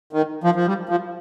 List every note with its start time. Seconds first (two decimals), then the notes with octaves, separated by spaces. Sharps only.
0.13 D#3
0.44 F3
0.55 F3
0.67 G3
0.89 F3